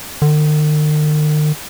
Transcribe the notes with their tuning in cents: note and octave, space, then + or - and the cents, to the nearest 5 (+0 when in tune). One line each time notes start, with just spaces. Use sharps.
D#3 -45